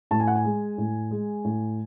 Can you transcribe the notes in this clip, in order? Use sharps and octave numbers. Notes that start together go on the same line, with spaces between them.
A2 A5
G#5
F#5
G#5
G#3
A2
G#3
A2